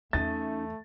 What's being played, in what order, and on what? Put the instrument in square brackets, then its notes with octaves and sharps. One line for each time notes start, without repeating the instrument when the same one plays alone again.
[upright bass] E2 [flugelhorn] A3 [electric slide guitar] C#4 D#4 E5 [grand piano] A6